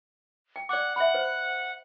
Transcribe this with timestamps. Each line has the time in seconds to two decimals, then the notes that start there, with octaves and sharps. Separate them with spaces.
0.56 G5
0.69 D5 F#5 D6
0.96 E5 F#5 B5
1.14 C5